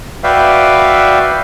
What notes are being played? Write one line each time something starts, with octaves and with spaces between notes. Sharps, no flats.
F#4 B4 D5 E5 F5 G5